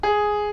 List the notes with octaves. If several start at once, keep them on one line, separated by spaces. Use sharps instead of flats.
G#4